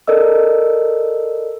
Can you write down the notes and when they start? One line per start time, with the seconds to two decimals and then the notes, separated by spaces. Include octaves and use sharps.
0.07 A4 A#4 D5 D#5 E6